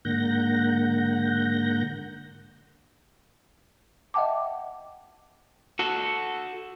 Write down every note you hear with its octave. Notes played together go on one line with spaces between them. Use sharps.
G#2 D3 A#3 F#5 G6 A#6
D#5 E5 F#5 G5 A5 D6
F#4 A4